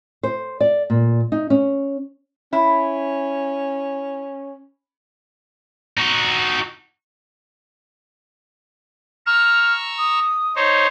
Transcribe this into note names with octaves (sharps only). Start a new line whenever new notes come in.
C5
D5
A#2
D#4
C#4
C#4 E4
D#4 F#4
A#5 C#6 E6 F6
D#6
D#4 C5 C#5